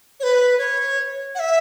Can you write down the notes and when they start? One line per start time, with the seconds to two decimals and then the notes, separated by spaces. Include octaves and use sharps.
0.20 C#5
0.23 B4
0.58 C#5
1.35 F#5
1.39 E5